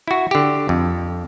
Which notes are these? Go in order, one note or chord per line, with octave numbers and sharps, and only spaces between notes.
E4 F#4
D3 G4
F2